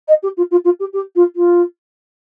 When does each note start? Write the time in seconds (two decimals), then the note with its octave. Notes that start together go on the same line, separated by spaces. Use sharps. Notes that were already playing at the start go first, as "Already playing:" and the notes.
0.08 D#5
0.23 G4
0.37 F4
0.51 F4
0.65 F4
0.80 G4
0.93 G4
1.16 F4
1.36 F4